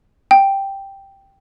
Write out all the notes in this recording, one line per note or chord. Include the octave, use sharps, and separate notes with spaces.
G5